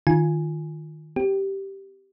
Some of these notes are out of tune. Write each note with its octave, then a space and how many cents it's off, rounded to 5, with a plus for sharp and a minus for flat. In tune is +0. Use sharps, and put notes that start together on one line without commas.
D#3 -10 F4 -5 G#5 +0
C4 -10 G4 -10